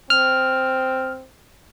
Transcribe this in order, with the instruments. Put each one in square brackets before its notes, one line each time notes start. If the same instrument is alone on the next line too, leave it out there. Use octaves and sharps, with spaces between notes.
[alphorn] C4 [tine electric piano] F6